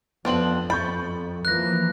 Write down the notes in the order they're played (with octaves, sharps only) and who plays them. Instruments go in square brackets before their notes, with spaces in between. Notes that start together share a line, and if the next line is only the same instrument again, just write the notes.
[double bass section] F2 [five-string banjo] F3 C4 D4 [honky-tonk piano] B3 F#7
[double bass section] F2 [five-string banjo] B5 [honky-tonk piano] C#6 G6 A6
[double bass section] E3 F3 A#3 [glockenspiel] F#6 A#6